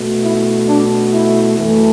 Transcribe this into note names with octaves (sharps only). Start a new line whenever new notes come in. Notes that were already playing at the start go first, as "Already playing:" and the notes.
Already playing: B2 A3
E4
D4
E4
F#2 E3 A3